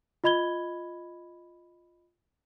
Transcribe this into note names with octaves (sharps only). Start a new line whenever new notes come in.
F4 D#5 B5 G#6 G7